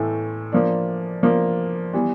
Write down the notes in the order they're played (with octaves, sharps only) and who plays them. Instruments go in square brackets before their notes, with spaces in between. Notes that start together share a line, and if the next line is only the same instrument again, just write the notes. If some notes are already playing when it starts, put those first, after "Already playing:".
Already playing: [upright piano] A2 E3 A3
F3 A#3 D4
F3 A#3 D4
E3 G3 B3